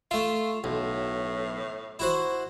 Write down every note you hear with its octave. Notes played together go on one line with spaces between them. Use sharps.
A3 F4 E5
B1 A2
E4 F#4 C5